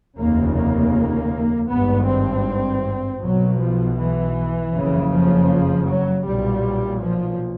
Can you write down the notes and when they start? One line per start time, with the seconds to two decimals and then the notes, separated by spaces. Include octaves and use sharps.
0.17 F1 D#2 C#3 A#3
0.55 A#3
1.69 G#1 G2 B3
2.07 C4
3.21 B1 B2 F#3
3.59 F3
3.97 E3
4.73 F#1 F2 C#3
5.11 F3
5.87 F#3
6.25 B1 A#2 G3
7.00 F3